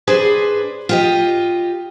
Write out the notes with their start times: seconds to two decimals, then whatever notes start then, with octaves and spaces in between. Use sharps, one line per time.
0.07 D4 G#4 B4 C5
0.89 F4 G4 D#5